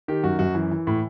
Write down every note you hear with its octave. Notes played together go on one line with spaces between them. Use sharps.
D#3 G4
F#2 F#4
F#2 F#4
E3
E3
A2